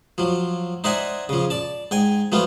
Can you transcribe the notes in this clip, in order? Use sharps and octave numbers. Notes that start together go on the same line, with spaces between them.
F3 F#3
D#4 C5 D5 E5 F#5 G#5
C#3 F3
D5 A5
G#2 G5 G#5
F3 F#3 A3 B3 F4